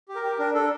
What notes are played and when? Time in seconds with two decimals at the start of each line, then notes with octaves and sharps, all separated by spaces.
0.09 G4
0.15 A#4
0.23 G4
0.38 D4 A#4
0.54 D4 A4